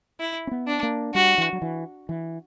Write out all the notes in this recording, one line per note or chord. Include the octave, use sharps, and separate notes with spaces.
E4
C#4
B3
D4
A#3
G3 F#4
E3
F#3
E3
E3